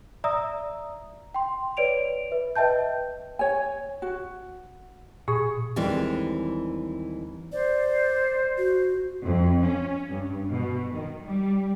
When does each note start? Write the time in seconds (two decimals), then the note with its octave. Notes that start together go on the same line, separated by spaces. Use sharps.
0.24 D5 E5 A#5 D#6 E6
1.34 G5 C6
1.77 B4 C#5 D5 D7 F7
2.31 B4 E5
2.56 B4 D#5 E5 G5 A5 G6
3.39 C#5 G#5
4.02 F#4
5.28 A#2 G#4 C#6
5.76 D#2 E3 G3 G#3 C4
7.52 C5 D5
8.58 F#4
9.24 F2
9.63 C#4
10.10 G2
10.50 B2
10.93 D#3
11.24 G3